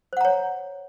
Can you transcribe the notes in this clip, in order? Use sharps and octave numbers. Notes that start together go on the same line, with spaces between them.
C5 C#5 F#5 A#5